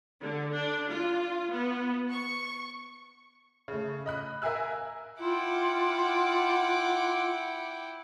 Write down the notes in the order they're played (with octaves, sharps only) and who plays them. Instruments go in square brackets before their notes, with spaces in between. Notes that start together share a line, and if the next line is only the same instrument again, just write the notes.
[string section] D3
D4
F4
B3
C#6
[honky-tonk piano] C#3 A3
D#5 B5 F#6
A#4 E5 F5 G#5 E6 F#6
[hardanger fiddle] E4 G5 [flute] F4 [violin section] F#5 D6